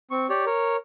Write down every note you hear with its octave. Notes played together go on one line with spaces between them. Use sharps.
C4 C#6
G4 C#5 D5
A#4 C#5